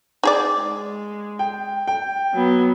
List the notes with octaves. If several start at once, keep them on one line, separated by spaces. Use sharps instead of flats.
D#4 G#4 D5
G#3
G5
G5
F#3 B3